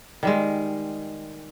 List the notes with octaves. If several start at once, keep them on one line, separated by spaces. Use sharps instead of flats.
D#3 G3 G#3